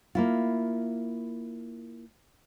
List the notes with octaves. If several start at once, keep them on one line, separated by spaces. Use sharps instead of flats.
A#3 E4 F4